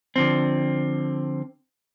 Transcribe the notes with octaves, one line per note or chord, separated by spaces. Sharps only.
D3 F3 C4